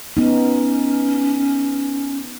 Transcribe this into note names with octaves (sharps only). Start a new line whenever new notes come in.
B3 C#4 D#4